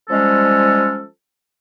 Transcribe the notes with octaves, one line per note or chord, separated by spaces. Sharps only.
F3 G3 G#3 C#4 A4